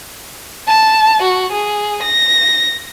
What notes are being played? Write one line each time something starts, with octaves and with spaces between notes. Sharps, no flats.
A5
F#4
G#4
A#6